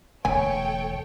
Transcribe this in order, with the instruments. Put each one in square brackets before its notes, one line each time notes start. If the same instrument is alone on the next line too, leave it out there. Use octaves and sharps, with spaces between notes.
[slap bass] E1 D2 [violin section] A4 C#5 G5 [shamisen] G#5